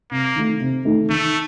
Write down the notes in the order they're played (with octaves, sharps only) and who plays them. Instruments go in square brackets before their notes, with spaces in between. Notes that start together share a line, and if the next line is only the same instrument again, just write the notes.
[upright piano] C3 [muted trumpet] A#3
[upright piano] D#3 A3 D#4
C3
D#3 A3 D#4
[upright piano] D#3 [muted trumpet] A3